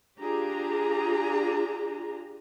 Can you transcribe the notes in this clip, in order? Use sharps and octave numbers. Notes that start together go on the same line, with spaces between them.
D4 F4 G4 G#4 A#5